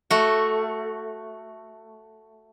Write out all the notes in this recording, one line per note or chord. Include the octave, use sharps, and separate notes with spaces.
A3 F#4